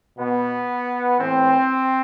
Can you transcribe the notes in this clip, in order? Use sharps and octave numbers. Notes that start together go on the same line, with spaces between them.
B2 B3
A2 E3 C4